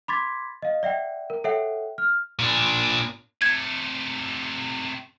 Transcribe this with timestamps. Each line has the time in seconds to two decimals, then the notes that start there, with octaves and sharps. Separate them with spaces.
0.08 B5 C6 D6 G#6 A6 B6
0.62 D#5 F5
0.83 D5 E5 F#5 G5
1.30 A#4
1.44 A4 C#5 E5 F#5 G5
1.98 F6
2.39 A#2 D4
3.42 C3 A3 G#6